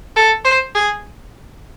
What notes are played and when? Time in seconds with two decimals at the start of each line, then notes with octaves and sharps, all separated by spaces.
0.16 A4
0.45 C5
0.75 G#4